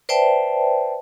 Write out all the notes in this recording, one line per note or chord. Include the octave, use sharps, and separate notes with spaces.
B4 C5 D5 E5 G5 A5